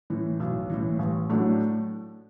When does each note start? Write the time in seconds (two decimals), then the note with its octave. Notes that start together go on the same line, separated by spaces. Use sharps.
0.10 A2 E3
0.40 B1
0.70 A2 E3
0.99 A1
1.30 A2 F#3 A3 D4